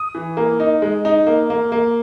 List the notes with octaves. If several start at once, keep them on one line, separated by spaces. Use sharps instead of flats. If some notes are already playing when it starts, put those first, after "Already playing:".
Already playing: D#6
E3
A#3
D#4
G#3
D#4
A#3
A#3
A#3